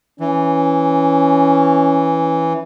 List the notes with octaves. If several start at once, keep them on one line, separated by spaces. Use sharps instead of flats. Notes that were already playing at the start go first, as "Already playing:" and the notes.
E3 C#4